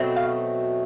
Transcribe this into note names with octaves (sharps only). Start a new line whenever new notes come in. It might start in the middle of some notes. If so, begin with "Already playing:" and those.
Already playing: B2 F#3 A3 C4
F5